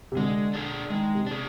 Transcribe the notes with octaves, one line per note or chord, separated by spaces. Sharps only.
C3
D3 G#3
D4 G#4
D#3 G#3
C3
D4 G#4